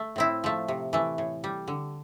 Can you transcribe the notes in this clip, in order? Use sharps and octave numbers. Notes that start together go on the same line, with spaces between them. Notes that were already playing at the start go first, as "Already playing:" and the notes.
Already playing: A3
A2 C4 E4
F3 A3
C3
E3 A3
A2
G3
D3